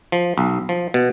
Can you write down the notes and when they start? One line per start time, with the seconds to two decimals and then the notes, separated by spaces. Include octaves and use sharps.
0.12 F3
0.38 B1
0.69 F3
0.94 B2